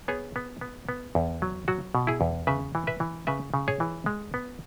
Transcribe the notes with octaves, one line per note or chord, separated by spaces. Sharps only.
B3 G#4 C#5
B3
B3
B3
E2
F#3
F#3 F#4
B2
E4 G#4
E2
C#3 B4 E5
E3
B4 E5
E3
C#3 B4 E5
C#3
G#4 C#5
E3
G#3
B3